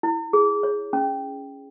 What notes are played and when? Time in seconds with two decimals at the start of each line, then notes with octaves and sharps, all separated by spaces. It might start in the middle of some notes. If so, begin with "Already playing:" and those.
0.03 E4
0.33 G#4
0.63 C#5
0.93 C#4